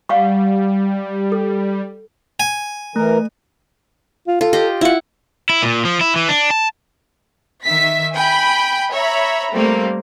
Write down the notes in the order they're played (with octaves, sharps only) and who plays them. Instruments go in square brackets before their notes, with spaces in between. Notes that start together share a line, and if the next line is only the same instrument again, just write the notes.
[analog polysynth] G3 [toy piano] F5 F#5 C#6
[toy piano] A4
[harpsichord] G#5
[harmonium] E3 A#4 [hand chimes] A3
[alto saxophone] F4
[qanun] F4 [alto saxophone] A4
[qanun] G4 D#5
[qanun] E4 F#5 [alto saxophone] F4
[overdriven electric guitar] E4
A#2
F3
E4
E3
D4
A5
[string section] D#3 E5 B6
G5 G#5 B5
C#5 E5 A#5 B5
G3 A3 A#3 C4